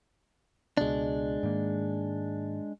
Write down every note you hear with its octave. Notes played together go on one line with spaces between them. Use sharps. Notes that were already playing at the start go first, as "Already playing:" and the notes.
C#2 B2 G#3 D4
G#2 D#3 A#3